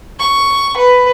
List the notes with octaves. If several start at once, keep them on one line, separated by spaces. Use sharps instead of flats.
C#6
B4